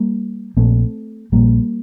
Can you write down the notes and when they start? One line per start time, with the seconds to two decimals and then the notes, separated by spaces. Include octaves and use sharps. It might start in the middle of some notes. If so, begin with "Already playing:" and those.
Already playing: G3 A#3
0.57 A#1 A#2 A3 C4
1.32 A#1 A#2 G3 A#3